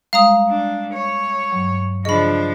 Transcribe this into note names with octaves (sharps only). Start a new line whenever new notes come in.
G3 G#3 F5 A#5 D#6
D4
C#5
G2 F#3
C#3 F3 D4 G#4 D#5 B5 C#6